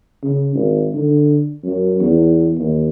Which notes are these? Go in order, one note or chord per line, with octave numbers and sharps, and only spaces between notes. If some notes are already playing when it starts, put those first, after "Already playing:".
C#3
G#1
D3
F#2
E2
D#2